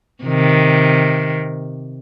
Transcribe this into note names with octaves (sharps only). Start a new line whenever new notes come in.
C3 D#3